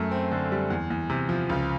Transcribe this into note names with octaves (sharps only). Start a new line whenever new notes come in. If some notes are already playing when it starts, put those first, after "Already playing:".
Already playing: F#2 A3
C4
D3
G3
E2
E2
C3
F3
C#2